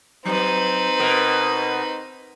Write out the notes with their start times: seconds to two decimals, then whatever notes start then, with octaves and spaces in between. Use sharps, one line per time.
0.25 F#3 C4 D#4 B4
0.99 B2 A#4